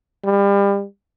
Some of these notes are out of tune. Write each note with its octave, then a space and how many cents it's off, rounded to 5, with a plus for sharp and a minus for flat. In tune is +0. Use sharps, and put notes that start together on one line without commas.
G3 +30